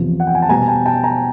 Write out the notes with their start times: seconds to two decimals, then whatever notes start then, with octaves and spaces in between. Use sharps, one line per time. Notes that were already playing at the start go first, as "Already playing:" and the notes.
Already playing: E2 C3 F3
0.20 F#5
0.27 G5
0.35 G#5
0.42 A5
0.49 B2 G3 B3 G#5 A#5
0.68 G5 A5
0.86 G5 A5
1.03 G#5 A#5